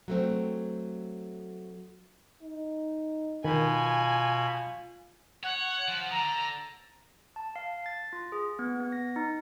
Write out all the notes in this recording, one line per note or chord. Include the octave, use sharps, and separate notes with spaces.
F#3 A3 C4
D#4
B2 D#3 F4 G#5 B5
C#5 F#5
F3
D3 A#5
A5
F5
A6
F4
G#4
B3
B3
A#6
D#4